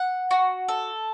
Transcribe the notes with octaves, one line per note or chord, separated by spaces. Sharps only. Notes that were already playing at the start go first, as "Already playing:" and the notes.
Already playing: F#5
F#4
A4